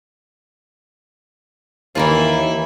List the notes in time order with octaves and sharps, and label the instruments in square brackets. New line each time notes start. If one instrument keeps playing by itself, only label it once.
[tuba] D#2 [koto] E3 A#3 F4 [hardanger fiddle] E4